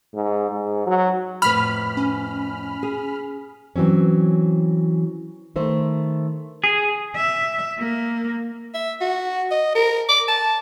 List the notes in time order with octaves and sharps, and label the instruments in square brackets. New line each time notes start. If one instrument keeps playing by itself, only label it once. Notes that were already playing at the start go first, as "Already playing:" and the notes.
[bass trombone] G#2
G#2
F#3
[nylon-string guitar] F2 A2 B4 [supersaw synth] B5 F6
[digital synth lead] C#4
[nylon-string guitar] G#4
E3 F#3 C4 C#4
D#3 A3 C5
[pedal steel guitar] G#4
[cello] E5
A#3
[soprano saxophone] E5
F#4
D#5
A#4
D6
A5